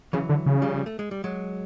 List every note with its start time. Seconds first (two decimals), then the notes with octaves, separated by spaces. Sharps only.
0.13 C#3 E3 F#3
0.29 D3
0.46 C#3
0.62 F3 G3
0.86 A3
0.99 G#3
1.11 G3
1.24 F#3 G#3